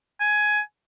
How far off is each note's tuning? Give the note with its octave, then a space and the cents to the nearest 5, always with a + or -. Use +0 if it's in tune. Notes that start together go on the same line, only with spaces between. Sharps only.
G#5 +15